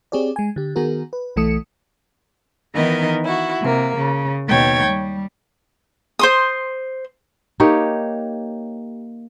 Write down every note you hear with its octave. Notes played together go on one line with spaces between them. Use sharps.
C4 G4 G#4 C#5 D5
G#3 G#5
D3 G4
D#3 B3 F#4 G#4 A#4
B4
B1 E3 A3 A4 D#6 C#7
D#3 E3 B3 D#4 A#4 D#5
E4 F#4
C3 A#3
C#3
D#2 B2 C#5 G5 G#6 A6
G3
C5 C6 D#6
A#3 D#4 G4 C#5